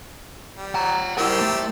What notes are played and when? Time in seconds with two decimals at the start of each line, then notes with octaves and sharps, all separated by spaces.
0.57 G3
0.75 F#5 A#5
1.18 E4 G4 A#4 C5 E6
1.41 A3